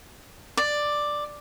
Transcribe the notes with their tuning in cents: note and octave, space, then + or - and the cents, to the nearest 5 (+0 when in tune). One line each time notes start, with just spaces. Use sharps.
D5 +5